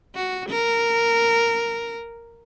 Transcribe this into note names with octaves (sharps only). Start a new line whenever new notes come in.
F#4
A#4